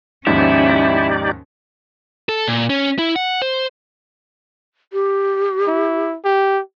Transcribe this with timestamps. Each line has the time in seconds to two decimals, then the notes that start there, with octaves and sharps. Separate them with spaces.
0.27 D#2 G#2 F3 C#4 D#4 E4 G4 D5
2.29 A4
2.48 A#2
2.70 C#4
2.98 E4
3.16 F#5
3.42 C5
4.93 G4
5.67 E4
6.25 G4